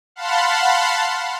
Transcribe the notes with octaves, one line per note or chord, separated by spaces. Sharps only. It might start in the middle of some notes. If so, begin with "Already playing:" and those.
F5 F#5 A5 B5 C6